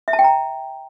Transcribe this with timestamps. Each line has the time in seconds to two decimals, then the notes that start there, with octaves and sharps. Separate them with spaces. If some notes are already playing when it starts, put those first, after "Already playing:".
0.08 E5
0.13 A5
0.19 G5
0.24 A#5